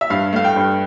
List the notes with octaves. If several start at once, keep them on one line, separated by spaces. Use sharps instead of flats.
E5
G2 F5
A3 F5
G5
G2